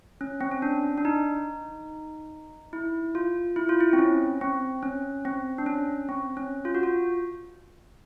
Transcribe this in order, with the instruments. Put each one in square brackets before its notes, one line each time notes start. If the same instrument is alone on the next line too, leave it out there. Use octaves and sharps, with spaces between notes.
[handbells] C#4
C4
C#4
D4
D4
D#4
E4
F4
E4
F4
E4
C4
C#4
C4
C#4
C4
D4
C#4
C4
C#4
F4
F#4
F4